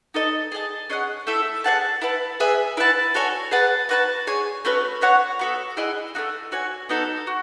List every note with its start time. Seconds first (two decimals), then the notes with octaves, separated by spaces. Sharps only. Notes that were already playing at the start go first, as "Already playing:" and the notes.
0.14 D#4 A4 D#5
0.52 G#4 D#5 A5
0.90 C#4 G#4 D#5 F#5
1.27 A3 E4 A4 E5
1.64 G#4 C#5 F#5 A5
2.02 E4 B4 F#5 A5
2.40 G#4 B4 E5 G#5
2.77 E4 B4 F#5 A5
3.14 F#4 A4 C#5 G#5
3.51 G#4 B4 F#5 A5
3.89 F#4 B4 F#5 A5
4.27 G#4 C#5 G#5
4.65 A3 C#4 F#4 B4
5.01 B3 F#4 C#5 F#5
5.39 B3 F#4 A4
5.77 E4 G#4 D#5 F#5
6.15 A3 D#4 F#4
6.52 F#4 C#5 G#5
6.89 B3 D#4 F#4 A4
7.27 F#4